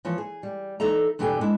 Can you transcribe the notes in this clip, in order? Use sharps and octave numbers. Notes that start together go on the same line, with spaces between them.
E3 F3 C#5
G#4
G3
E3 D#4 A4 E5 A#5
E2 G2 B2 G4 A4 G#5
G#3 D4 E4